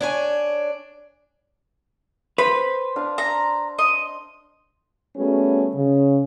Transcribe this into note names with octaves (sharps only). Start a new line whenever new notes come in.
D4 C#5 G#5
B4 C5 B5
D4 F5 D6
A#5 E6
D#5
G3 A3 B3 C#4 F#4 G#4
C#3